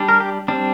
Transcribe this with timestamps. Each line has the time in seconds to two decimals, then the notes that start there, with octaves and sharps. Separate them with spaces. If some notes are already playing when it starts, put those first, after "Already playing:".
Already playing: G3 D4
0.09 A#4
0.20 G4
0.48 G3 C4 D4